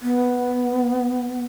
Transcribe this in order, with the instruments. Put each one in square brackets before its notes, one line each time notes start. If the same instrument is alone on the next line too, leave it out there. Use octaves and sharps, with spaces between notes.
[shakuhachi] B3